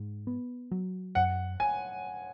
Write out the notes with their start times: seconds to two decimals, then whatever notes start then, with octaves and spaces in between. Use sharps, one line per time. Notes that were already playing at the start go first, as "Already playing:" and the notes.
Already playing: G#2
0.27 B3
0.71 F#3
1.15 F#2 F#5
1.60 G#5